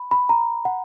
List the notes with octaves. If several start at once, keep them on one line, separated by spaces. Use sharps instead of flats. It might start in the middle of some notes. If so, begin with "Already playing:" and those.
Already playing: B5
B5
A#5
F#5